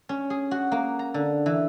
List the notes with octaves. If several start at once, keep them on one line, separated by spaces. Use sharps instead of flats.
C#4
G#4
F#4
A#3
A#5
D3
E3